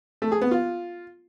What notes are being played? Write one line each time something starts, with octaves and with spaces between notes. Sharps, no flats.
A3
G#4
B3
F4